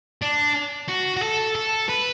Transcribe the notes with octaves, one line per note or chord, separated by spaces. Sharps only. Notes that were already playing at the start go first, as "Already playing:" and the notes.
D4
F#4
F#4
A4
A4
B4